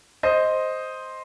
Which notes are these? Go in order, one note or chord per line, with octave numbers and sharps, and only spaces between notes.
C5 D#5